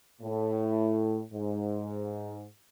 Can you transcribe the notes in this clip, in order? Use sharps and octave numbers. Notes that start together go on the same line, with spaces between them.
A2
G#2